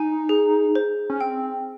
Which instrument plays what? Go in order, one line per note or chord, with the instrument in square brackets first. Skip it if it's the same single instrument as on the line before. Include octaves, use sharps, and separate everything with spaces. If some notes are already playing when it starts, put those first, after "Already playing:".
Already playing: [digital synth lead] D#4 [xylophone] G#5
[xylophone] G#4
C5
[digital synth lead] C#4
[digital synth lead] C4 [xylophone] G5